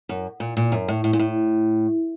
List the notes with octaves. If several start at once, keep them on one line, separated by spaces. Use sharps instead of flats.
F#2
A#2
A#2
F#2
A2
A2
A#2
A2